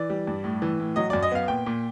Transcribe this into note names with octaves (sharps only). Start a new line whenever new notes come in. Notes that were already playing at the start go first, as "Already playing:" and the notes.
Already playing: E3 D5
G3
G2
A2
E3
A2
F#3 D#5
F#2 D5
D#5
B3 F5
A#2 G5
A#2